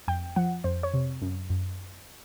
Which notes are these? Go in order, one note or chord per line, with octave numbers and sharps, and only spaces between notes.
F2 G5
F3 F#5
F2 C5
C#5
C3
F#2
F#2